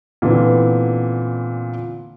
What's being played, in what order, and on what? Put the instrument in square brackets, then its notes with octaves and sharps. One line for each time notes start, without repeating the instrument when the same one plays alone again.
[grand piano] A#2 D3 E3 B3 C4